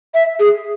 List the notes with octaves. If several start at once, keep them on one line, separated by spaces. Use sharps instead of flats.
E5
G#4